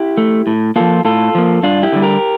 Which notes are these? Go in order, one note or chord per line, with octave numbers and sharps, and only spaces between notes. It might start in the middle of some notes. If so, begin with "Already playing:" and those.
Already playing: E4 G4
A3
A2
F3 A#3 F4 A4
A2 F4 A4
F3 A#3
G2 D4 F4
E4 G4
D3 G3
G4 A#4